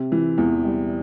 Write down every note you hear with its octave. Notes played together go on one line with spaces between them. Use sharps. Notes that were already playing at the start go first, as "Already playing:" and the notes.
Already playing: C3
E3
E2
G3